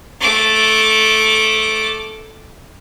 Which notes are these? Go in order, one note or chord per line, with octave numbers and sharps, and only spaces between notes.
A3 D6